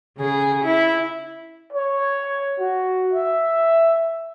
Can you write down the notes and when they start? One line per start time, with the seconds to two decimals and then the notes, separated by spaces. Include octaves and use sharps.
0.18 C#3 G#4
0.64 E4
1.73 C#5
2.59 F#4
3.13 E5